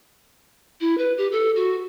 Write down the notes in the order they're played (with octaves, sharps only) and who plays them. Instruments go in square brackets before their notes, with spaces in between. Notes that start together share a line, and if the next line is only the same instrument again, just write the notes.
[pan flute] E4
B4
G4
A4
F#4